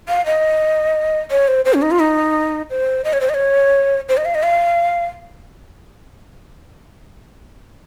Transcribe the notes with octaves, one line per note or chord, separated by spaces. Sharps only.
F5
D#5
C#5
C5
C5
C#4
D#4
F4
D#4
C5
D#5
C#5
C5
D#5
C#5
C5
D#5
F5
D#5
F5